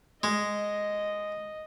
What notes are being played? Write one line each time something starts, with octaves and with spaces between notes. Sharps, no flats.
G#3 D#5